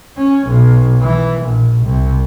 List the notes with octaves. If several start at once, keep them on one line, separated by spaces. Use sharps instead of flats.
C#4
B1
E3
A#1
C2